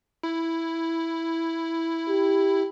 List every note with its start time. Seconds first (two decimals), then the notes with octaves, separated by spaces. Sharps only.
0.23 E4
2.08 G4